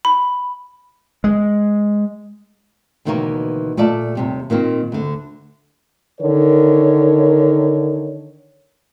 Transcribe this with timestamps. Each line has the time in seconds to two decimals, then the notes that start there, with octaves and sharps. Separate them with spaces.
0.05 B5
1.24 G#3
3.05 D2 B2 D#3 E3 A#3 C#5
3.77 A#2 A3 F4 D5 A5
4.15 D#2 C3 G3
4.50 A#2 D#3 A#3 C4
4.92 D2 D3
6.20 D3 D#3 A#4 C#5